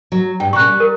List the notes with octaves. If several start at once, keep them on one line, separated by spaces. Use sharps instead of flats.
F#3
G2 G5
A#2 C#3 C#6 F#6
G3
A#4